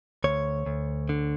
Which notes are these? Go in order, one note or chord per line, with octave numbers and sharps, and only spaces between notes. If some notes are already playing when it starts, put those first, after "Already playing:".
D2 C#5
D2
D3